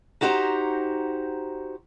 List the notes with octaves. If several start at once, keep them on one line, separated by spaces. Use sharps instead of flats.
D#4 F#4 G4 C5 E5 A#5